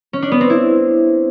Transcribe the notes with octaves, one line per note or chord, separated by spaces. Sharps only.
C#4
D4
B3
C4
E4